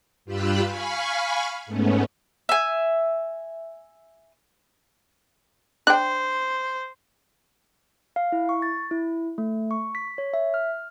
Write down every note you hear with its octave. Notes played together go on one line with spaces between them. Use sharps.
G2 F4 G4 B5 E6 F#6
F5 G#5 B5 C#6 F6
G#2 A3 B3 C#4
E5 G#5
D4 C5 G5 F#6
F5
E4
C#6
A6
E4
A3
C#6
B6
C#5
E5
F6